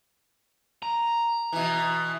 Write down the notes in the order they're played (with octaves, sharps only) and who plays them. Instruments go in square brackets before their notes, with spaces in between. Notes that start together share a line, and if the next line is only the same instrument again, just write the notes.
[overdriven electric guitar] A#5
[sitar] B2 E3